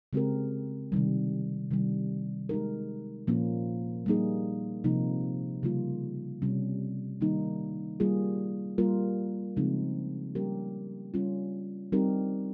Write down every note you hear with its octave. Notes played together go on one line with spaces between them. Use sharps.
C#3 G#3 C4 G4 A#4
C3 D#3 G3
C3 D#3 G3
G#3 D#4 G4 A#4
A#2 F3 A#3 C#4 F4
G3 A#3 D#4 G#4
C3 F3 A#3 D#4
C#3 G3 A#3 F4
C3 G3 C#4
D#3 G3 A#3 D#4
G3 A#3 F4 G#4
G3 A#3 F4 A#4
C#3 F3 G#3 C4 D#4
G3 A#3 C#4 G4 A#4
G3 C#4 F4
G3 C4 D#4 G4 A#4